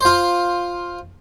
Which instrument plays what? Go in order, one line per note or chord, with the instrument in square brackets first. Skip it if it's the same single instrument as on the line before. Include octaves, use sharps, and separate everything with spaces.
[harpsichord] F4 C5